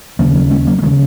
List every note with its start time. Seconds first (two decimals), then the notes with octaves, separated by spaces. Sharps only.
0.19 D#2 C#3 F#3 A#3
0.35 F#3 A#3
0.51 G#3 C#4
0.67 F#3 A#3
0.79 A#3
0.82 D#3 G#3
0.86 C#3